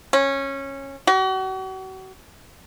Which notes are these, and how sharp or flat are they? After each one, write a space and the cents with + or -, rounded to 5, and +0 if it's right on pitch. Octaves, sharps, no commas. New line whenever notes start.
C#4 -15
F#4 +40